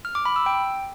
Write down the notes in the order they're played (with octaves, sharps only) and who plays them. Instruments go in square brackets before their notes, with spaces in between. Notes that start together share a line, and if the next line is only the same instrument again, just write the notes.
[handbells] F6
D6
B5
E6
G5